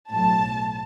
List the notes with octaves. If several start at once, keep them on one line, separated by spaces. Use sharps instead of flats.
B1 A2 F#3 A5